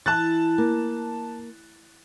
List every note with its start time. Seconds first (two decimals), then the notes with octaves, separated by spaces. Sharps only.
0.06 E3 A5 F#6 A6
0.58 A#3